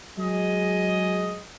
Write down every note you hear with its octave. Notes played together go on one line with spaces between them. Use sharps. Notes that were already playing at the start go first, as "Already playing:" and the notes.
F#3 G#3 G#4 D#5